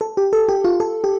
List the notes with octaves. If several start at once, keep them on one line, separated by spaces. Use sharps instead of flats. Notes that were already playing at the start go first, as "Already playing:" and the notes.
A4
G4
A4
G4
F4
A4
G4